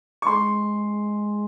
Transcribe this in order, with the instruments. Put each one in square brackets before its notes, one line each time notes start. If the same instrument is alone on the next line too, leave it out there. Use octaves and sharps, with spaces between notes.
[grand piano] C#6
[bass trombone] G#3 [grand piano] C6